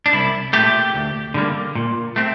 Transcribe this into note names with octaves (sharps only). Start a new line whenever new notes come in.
D4
C2 E4
A#2 A3 G4
D2
D3 G3 A#3
A#2
A3 C4